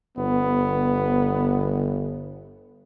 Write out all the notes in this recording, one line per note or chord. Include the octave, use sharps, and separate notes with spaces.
G1 B3